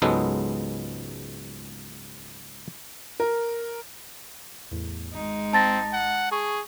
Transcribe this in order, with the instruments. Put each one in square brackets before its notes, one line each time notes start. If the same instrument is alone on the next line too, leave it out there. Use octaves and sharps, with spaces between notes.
[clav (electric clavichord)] C#2 G#2 F#3 G#3 B3 A4
[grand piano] A#4
[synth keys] E2 A2
[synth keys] G#1 [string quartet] G#3 D#4
[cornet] C4 [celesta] A5 A6 A#6
[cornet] F#5
[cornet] G#4 [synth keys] C#6